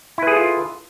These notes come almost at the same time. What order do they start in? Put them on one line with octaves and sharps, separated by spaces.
E4 B4 G#4 A4 F4